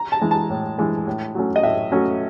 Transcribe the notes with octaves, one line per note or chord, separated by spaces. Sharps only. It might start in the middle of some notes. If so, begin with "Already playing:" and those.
Already playing: A#5
A5
E3 G#3
A5
A2
E3 G#3
A2
F#3 A3 C#4
D#5
A2 E5
F#3 A3 C#4